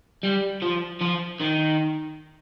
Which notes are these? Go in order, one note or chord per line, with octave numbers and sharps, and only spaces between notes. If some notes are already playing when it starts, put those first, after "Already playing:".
G3
F3
F3
D#3